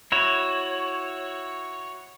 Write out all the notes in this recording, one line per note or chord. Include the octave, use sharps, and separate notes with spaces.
E4 F#4 C#5